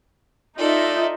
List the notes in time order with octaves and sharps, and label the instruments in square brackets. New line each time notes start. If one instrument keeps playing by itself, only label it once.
[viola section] D#4 [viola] F4 E5 [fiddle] A4 D5